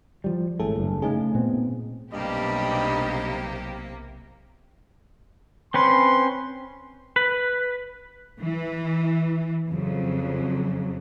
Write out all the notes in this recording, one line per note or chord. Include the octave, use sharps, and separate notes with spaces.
F3 G3
G#1 A2 G#4 A4
F#1 G2
C#3 A3 D#4 G#4
A#2 B3 C4
B1 G2 C3 A#3 G4 D#5 B5
C4 C#4 B4 C6
B4
E3
F2 C#3 F#3